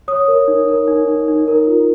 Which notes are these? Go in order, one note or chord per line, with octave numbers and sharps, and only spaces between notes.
C#5 D#6
A#4
D#4
A#4
D#4
D#4
D#4
A#4
F4